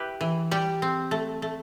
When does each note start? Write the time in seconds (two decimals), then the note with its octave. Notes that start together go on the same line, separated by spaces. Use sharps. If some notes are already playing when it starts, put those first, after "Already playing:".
Already playing: E4 G4 B4
0.21 E3
0.51 G3 G4
0.82 C4
1.11 A3
1.42 A3